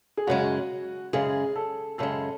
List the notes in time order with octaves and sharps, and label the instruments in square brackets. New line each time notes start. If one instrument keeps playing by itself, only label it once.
[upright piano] G#4
[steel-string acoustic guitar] F#2 C#3 G#3 [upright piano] F#4
[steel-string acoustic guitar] F#2 C#3 G#3 [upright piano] G#4
[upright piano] A4
[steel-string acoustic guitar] F#2 C#3 G#3 [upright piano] A4